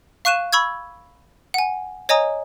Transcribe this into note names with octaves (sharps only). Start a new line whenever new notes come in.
F5 C#6 F#6 D#7 E7
B5 C#6 E6 G#6
F#5 G#5
C#5 D#5 G#5 A#5 D#6